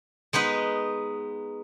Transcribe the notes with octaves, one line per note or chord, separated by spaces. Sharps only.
G#3 B3 D#4 B4